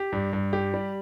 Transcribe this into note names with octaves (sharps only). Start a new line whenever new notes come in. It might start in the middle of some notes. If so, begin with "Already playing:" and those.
Already playing: G4
G2
G2
G4
G3